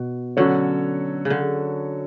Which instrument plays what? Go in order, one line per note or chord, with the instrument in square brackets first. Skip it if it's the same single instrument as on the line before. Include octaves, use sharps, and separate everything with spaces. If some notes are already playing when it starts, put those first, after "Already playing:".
Already playing: [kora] B2
[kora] D3 [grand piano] F#3 C#4 F#4 A4 C#5
[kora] C#3
D3